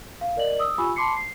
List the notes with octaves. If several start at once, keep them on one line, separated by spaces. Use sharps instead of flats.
F5
A#4 D5 D#5 F#7
D#6 E6
F4 G4 G#5 B5 C#6 E6
A5 B5 C6 D6 C7 C#7
C7